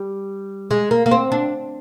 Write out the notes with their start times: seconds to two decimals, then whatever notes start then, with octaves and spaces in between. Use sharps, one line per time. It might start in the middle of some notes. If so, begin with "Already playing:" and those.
Already playing: G3
0.71 G#3
0.91 A#3
1.06 A#3
1.11 C4
1.32 D4